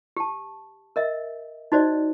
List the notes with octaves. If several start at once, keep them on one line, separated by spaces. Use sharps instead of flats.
G4 A5
A#4 D#5 E5
D#4 F#4 C5 D5 D#5